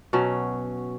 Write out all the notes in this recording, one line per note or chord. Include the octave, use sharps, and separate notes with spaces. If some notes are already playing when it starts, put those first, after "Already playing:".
B2 F#3 C#4